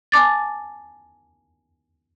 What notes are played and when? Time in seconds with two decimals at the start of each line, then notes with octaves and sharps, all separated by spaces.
0.12 G#5 A5 D6 A6